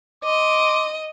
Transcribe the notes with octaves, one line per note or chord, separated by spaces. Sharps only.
D#5 C6 D6